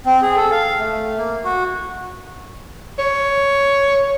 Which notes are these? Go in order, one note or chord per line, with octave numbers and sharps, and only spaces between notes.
C4
G#4
A4
F5
A3
A#3
F#4
C#5